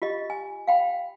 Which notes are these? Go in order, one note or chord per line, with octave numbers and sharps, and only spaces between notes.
F4 G4 D#5
G#5
F5 G5 B5